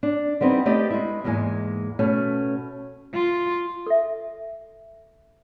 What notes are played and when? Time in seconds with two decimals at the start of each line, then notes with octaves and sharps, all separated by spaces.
0.03 D4
0.41 G3 B3 C4 D#4 E4
0.65 A3 B3 G4 D5 D#5
0.91 G#3 E4
1.24 E2 G#2 G#3 A#3 G#5
1.99 B2 A3 C#4
3.14 F4
3.87 A4 E5